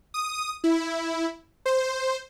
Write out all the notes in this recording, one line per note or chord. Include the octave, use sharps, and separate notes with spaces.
D#6
E4
C5